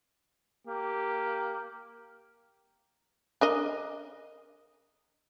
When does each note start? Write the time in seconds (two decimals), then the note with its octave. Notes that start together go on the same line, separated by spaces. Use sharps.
0.67 A#3 G4
3.41 D4 A#4 D#5